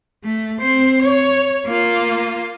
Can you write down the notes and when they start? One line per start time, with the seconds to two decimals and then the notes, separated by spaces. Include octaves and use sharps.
0.24 A3
0.60 C4 C5
1.02 C#5
1.66 A#3 F4